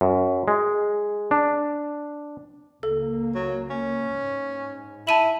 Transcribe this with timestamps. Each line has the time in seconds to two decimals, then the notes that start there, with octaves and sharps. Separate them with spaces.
0.01 F#2
0.48 G#3
1.31 D4
2.83 C#2 A#3 A4
3.35 F#3
3.70 C#4
4.11 G#2
5.07 E4 A5 D#7 F#7